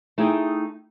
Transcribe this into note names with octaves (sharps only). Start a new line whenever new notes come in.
A3 D#4 E4 G#4 G5